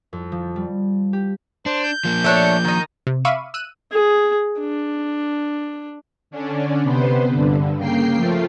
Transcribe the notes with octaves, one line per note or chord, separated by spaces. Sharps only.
F2
F3
G3
G4
D4 C5
G6
F3 A#3
A3 D4 C#5
D#3 D#4
C3
E5 F5 B5 C#6 D6 D#7
E6 F#6 D#7
G#4
D4
D3 C#4 D4
C3 B3 B4 C5
G2 D3
C#3 A#3 G5 C7
F3 A3 F4